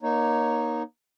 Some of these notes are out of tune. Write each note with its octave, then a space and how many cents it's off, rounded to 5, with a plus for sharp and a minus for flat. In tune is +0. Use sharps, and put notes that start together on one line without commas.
A#3 +30 D#4 -5 C#5 +5